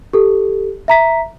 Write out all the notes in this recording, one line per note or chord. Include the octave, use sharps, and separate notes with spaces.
G4 A4
E5 A#5 B6